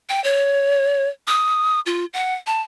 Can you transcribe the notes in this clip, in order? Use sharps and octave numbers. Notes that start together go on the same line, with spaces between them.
G5
C#5
D#6
F4
F#5
A5